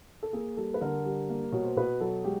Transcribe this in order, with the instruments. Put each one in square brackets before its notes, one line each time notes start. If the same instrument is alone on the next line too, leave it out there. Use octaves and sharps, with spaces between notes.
[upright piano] A4
A#3 G#4
G3 A4
B4
D3 A#4
G3
A#3
B2 C#5
C5
B2 B4
F#3 A4
G#3 G4